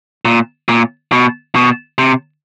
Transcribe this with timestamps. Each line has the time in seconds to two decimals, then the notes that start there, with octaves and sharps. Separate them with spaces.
0.25 A#2
0.69 A#2
1.12 B2
1.55 B2
1.98 C3